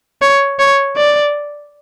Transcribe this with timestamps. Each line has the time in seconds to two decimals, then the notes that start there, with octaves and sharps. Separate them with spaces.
0.22 C#5
0.59 C#5
0.97 D5